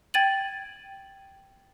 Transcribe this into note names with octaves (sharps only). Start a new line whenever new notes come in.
G5 G#6 A6 D#7 F#7